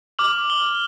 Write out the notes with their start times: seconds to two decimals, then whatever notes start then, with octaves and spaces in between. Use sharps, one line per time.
0.19 D6 F6 F#7
0.50 G7